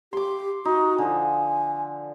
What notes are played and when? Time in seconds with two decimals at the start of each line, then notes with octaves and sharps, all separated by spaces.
0.13 G4 C6 D6
0.65 D#4 F#4
0.98 D3 F3 G#5